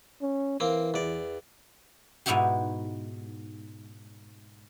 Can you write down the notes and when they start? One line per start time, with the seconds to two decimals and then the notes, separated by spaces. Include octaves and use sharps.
0.22 C#4
0.60 E3 A#3 C4
0.94 E2 D5
2.26 G#2 B2 D#4 E4 F#4 G4